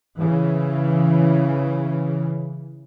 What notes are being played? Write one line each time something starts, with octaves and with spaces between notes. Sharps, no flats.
C#3 E3